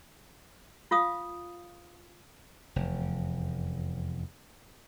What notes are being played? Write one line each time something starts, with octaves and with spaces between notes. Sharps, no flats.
F4 F5 D#6
F1 E2